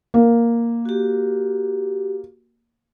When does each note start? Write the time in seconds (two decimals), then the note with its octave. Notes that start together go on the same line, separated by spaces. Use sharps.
0.14 A#3
0.85 F#4 G4